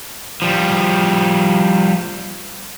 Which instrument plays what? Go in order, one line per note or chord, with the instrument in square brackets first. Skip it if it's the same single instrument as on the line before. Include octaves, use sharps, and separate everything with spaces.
[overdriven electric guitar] F3 G3